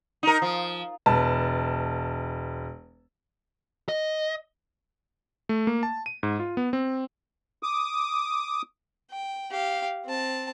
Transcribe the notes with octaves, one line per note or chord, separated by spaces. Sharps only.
D#4 A#4
F3
E1 B4 A5
D#5
A3
A#3
A5
D#7
G#2
F4
B3
C4
D6 D#6
G5
G4 F5
C4 A5